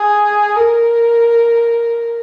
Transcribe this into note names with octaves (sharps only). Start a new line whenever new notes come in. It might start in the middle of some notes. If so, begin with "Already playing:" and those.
Already playing: G#4
A#4